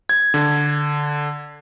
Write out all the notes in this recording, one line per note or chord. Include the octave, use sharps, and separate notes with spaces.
G#6
D3